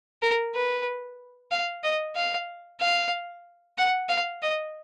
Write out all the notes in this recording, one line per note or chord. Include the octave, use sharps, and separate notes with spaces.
A#4
B4
F5
D#5
F5
F5
F#5
F5
D#5